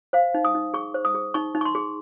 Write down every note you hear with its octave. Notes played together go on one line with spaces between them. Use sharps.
C5 F5
D#4
D#6
D#4
G#4 C#6
C5
D#6
G#4
D#4 C#6
D#4
C#6
C6
G#4